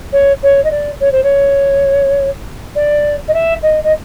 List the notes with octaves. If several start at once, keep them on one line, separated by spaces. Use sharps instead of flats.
C#5
C#5
D#5
D5
C#5
C5
C#5
D5
D#5
E5
D#5
D#5